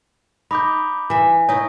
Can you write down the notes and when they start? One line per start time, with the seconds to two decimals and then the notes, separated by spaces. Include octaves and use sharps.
0.51 D#4 B5 D6 G6
1.10 E3 E5
1.49 D#4 E4 C#5